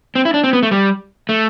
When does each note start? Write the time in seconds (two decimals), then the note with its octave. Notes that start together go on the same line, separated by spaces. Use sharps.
0.15 C4
0.25 E4
0.34 D4
0.44 C4
0.53 B3
0.63 A3
0.71 G3
1.29 A3